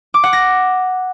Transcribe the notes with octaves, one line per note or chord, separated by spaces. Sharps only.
D6
F#5
A#6